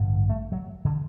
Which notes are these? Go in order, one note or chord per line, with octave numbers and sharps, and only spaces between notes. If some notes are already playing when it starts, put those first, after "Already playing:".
Already playing: A1 G2 D3
A3
F#3
D3